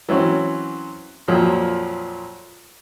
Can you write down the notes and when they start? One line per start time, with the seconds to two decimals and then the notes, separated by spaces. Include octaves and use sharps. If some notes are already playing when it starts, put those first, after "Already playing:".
0.09 E3 F#3 C4 C#4
1.28 F2 A#2 F3 F#3